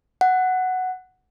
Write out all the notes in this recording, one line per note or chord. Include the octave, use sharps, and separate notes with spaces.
F#5